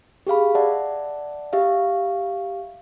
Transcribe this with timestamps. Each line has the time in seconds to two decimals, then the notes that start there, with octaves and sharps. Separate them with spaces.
0.27 G4 G#4 F5 B5
0.55 D5 E5 F#5 A5
1.53 G4 E5 F5